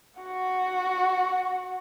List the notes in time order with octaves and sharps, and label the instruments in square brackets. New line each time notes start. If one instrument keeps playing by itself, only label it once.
[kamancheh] F#4 F#5